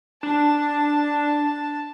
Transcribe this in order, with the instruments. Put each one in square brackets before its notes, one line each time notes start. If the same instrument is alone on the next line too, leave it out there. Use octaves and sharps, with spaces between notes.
[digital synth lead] D4 [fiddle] A5